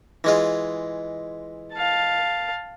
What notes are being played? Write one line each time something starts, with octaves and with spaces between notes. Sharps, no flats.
E3 G#3 F4
F5 A5